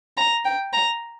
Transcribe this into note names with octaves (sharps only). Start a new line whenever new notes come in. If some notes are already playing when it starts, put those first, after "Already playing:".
A#5
G5
A#5